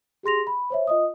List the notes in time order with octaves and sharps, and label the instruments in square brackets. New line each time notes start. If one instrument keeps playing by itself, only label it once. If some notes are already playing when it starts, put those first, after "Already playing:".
[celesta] G4 G#4 C6 A#6 F7
B5
C5 C#5 E5
F4 D#5 D#6